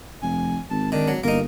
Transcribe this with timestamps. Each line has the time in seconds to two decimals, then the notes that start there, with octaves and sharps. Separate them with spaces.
0.22 F1 G#5
0.70 G#1 A5
0.92 D#3 D4
1.08 F#3
1.24 G1 A#3 D#4 A#4